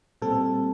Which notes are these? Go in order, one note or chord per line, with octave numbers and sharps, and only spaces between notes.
A#2 G3 C4 A4